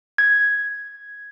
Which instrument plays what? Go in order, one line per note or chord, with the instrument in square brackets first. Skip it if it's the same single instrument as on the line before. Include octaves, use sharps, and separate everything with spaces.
[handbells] G#6